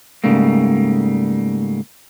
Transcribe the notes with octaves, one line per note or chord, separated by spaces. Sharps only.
G#2 C#3 G3 A3 A#3